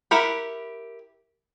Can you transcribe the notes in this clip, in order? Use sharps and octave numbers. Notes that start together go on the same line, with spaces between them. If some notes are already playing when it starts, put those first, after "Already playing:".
E4 G4 A#4 F#5 B5